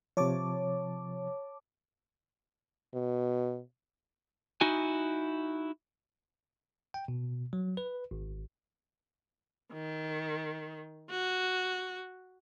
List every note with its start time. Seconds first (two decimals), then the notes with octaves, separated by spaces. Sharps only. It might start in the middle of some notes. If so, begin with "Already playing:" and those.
0.17 C3 F3 C#5 A5 D6
2.94 B2
4.61 D#4 E4 F#4 G#5
6.94 G5
7.08 B2
7.53 F#3
7.77 B4
8.11 G#1
9.73 D#3
11.11 F#4